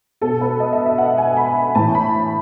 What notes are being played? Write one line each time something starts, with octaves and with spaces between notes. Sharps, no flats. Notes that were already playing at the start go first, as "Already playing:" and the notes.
B2 A4
B4
D#5
E5
E5
F#5
G#5
B5
A2 E3 A5
B5